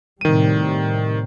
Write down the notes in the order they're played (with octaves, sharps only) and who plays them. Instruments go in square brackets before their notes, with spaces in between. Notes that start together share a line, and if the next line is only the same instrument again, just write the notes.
[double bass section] A2 C3 G3 [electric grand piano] D#3 D#7